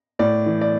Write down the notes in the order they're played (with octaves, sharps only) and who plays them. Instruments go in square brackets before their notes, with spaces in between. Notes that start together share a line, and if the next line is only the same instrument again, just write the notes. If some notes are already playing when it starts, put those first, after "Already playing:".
[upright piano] A2 D5
E3
D5